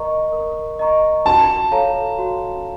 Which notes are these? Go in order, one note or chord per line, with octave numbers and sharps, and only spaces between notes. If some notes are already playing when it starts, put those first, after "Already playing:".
Already playing: A#4 D#5 A#5 C#6
A#4
D#5 A#5 C#6
F#4 A5
A4 C#5 F5 A#5
F#4